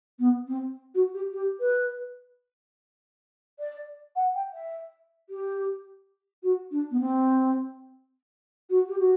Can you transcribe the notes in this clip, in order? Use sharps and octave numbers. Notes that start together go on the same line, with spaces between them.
B3
C4
F#4
G4
G4
B4
D5
F#5
G5
E5
G4
F#4
D4
B3
C4
F#4
G4
F#4